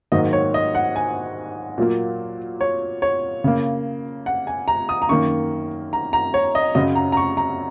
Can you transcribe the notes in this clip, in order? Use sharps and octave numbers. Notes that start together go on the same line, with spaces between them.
G#2 D#3 F#3 A#3 D#5
C#5
D#5
F#5
G#5
A#2 F#3 A#3
C#5
C#5
C#3 A#3
F#5
G#5
A#5
D#6
A#5
F#2 D#3 A#3 C#6
A#5
A#5
C#5
D#5
F#2 C#3 F#3 D#5
A#5
A#5
C#6
A#5